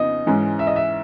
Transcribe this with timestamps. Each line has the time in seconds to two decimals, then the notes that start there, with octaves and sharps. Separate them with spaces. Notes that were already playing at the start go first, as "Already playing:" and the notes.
Already playing: F2 C#3 B3 D#4 D#5
0.27 G#2 E3 G#3 C#4
0.59 E5
0.67 D#5
0.76 E5